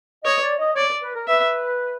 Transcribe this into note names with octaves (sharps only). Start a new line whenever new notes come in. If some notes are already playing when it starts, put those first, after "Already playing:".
C#5 D#5
D5
D#5
C#5 D5
B4
A#4
B4 E5